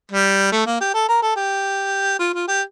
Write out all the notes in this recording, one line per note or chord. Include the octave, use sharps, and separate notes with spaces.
G3
A3
A#3
G4
A4
A#4
A4
G4
F4
F4
G4